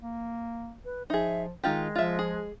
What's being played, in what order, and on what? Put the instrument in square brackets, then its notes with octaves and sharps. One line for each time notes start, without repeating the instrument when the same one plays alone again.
[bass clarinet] A#3
[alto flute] B4
[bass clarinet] F3 [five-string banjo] D#4 G#4 [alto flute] E5
[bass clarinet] D#3 [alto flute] G#3 [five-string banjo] D#4 F4 G4
[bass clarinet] F3 [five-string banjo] F4 E5
[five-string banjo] G#4